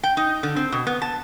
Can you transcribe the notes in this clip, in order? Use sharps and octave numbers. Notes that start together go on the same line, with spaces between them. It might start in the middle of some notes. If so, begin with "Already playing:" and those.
G5
D#4
D3
C4
B2
B3
A5